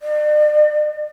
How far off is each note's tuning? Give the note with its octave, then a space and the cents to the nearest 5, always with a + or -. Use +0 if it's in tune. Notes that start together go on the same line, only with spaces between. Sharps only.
D5 +40